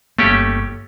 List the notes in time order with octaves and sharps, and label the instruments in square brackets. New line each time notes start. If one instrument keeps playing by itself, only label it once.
[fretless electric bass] G1 A#3 [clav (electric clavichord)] A3 C#4 G4